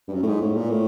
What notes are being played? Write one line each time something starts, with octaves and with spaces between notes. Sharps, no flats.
G2
F#2
A2
G#2
A2
A#2
A2